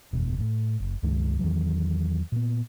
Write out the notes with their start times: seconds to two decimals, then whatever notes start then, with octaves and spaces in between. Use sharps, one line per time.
0.13 F#1 E2 B2
0.40 A2
0.80 F#1
1.03 C#2 G2 D#3 G#3
1.39 E2 D#3 E3 F#3
2.32 A#2 B3